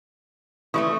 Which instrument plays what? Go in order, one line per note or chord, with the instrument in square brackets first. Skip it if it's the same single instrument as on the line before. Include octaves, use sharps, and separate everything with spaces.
[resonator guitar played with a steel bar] E3 G#3 A3 [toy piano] C6 C#6 D#6